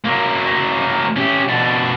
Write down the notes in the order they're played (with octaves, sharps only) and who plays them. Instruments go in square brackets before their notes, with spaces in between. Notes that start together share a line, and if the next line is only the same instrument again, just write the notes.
[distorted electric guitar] F#3 A#3
C#4 G4
B2 D4